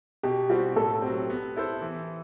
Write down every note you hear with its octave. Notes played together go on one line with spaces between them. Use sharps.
B2 G4
G3 C4 F#4
A2 A4
F#3 C4 G4
B3
E4 A4 C5
E3